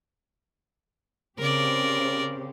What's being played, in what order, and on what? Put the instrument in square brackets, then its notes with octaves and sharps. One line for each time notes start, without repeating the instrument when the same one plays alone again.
[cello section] C#3 C4 G4 [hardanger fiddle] A#4 D5